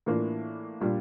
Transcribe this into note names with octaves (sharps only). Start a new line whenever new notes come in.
A2 E3 A#3 D4 F4
A#2 G3 D4 F4